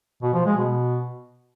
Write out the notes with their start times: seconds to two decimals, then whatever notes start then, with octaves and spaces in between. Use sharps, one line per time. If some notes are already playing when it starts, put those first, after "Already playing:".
0.22 B2
0.34 F3
0.46 G#3
0.57 B2